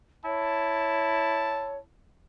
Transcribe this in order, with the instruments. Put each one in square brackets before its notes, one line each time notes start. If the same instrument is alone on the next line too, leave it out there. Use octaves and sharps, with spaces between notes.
[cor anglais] E4 [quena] C#5 [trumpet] A5